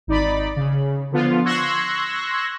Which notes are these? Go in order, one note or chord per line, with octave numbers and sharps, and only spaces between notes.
G#1 D#4 D5 B5
C#3
D3 F3 B3 F4
C6 C#6 E6 F#6 G#6 A#6